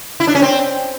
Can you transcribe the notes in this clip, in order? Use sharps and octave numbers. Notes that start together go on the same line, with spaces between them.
E4
D4
C#4
C4